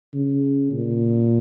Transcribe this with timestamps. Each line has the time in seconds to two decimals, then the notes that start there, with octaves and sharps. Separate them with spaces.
0.14 C#3
0.72 A#2